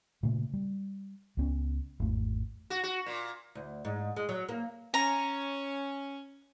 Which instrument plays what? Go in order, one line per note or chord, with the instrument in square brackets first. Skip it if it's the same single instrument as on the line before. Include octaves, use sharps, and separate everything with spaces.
[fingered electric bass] A#2 C#3 A3 A#3
G3
C#2 B3 C#4
G#1 E2 A3
[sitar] F#4
F#4
A#2
[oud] D2
G#2
G#3
F#3
A#3
[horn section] C#4 [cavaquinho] A#5